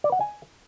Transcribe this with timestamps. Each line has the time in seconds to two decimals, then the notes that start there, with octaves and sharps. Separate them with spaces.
0.04 D5
0.12 F#5
0.21 G#5